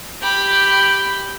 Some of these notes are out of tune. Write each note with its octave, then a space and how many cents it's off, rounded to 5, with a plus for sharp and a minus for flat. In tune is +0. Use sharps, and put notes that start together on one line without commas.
G4 +0 B5 +0